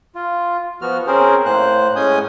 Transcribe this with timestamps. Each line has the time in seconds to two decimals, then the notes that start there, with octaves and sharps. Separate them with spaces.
0.15 F4
0.82 F3 B3 F#4 F6
1.07 C4 C#4 G#4 A#4 C5
1.45 A2 A#3 C5 F#6
1.96 A2 G#3 C#4 G#5 D#6 G6